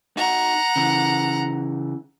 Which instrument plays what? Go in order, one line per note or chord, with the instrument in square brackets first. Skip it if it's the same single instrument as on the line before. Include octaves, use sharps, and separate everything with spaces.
[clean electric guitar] D#4 F#4 [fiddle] F#5 A#5
[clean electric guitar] C#3 E3